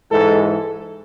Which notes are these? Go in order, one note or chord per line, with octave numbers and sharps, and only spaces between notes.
G#2 E3 G#3 A4
A4